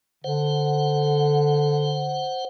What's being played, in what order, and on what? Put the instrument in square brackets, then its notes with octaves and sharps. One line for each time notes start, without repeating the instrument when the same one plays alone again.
[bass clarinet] D3 [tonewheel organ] C5 F#5